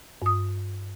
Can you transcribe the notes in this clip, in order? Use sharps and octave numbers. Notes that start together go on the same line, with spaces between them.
G2 D#6